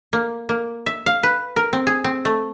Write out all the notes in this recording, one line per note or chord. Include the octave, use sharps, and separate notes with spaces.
A#3
A#3
E5
F5
B4
A#4
C4
G#4
C4
A3